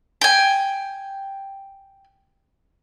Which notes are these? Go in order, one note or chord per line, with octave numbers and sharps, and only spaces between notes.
G5 G#5